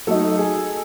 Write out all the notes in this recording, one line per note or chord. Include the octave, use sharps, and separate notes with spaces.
F#3 A3 D#4 A4
G#4